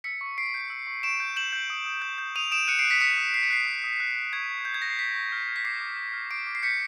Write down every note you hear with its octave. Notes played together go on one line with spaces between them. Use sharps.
E6 B6 C#7
C#6
C#6 C7 D7
G6
E6
C#6
C#6 D7 E7
G6
G6 E7 F#7
G6
D#6
D#6
G6
G6
D#6 D#7 F7
D#6 D7 E7
F#6 C#7 D#7
C7 D7
F#6
B6 C#7
D#6 B6 C#7
D#6
F#6 C7
C#7
F#6 C7
D#6
D#6
F#6
F#6
C#6 G#6
C#6
F#6 G6
G#6
F#6 A#6
C7
C#6 B6
C#6
F6
F6
B6
D6 C7
D6
F6
F6
D6 C7 D7
D6
C7
G6 B6 C#7